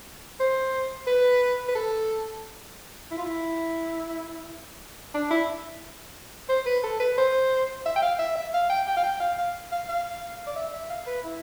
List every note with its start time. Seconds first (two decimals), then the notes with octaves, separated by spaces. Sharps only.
0.40 C5
1.07 B4
1.68 B4
1.75 A4
3.11 E4
3.18 F4
3.25 E4
5.14 D4
5.30 E4
6.49 C5
6.66 B4
6.84 A4
7.00 B4
7.18 C5
7.86 E5
7.96 G5
8.02 F5
8.19 E5
8.36 E5
8.54 F5
8.70 G5
8.87 G5
8.97 F5
9.03 G5
9.20 F5
9.38 F5
9.72 F5
9.89 F5
10.47 D5
10.56 E5
10.74 E5
10.90 F5
11.07 B4
11.24 E4